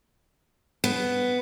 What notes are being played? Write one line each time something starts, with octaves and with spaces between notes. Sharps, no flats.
B3